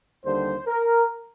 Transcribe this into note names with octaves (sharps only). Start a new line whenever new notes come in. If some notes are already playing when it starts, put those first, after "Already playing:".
D#2 D3 G3 C5
A#4